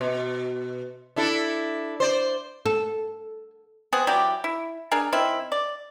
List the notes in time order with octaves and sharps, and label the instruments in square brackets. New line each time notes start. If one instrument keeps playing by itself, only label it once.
[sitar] B2
D4 E4 A4
C5 D5
[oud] A4
[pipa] B3 C4 G#4 F#5
E3 F#3 G4 D5
E4
D4 G#4 A#4
D#3 C4 E4
D5